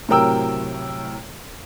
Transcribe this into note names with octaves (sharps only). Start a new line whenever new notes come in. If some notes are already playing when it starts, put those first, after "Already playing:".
A2 C3 F#3 A#4 G5 E6